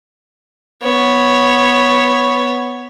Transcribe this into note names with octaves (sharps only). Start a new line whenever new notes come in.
B3 C#5